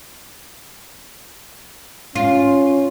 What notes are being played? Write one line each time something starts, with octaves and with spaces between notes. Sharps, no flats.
C#4 F4